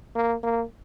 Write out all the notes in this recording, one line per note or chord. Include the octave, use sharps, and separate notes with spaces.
A#3
A#3